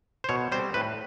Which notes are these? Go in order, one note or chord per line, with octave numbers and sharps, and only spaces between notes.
C5
B2 C#5
G3 C4 C5
A2 B4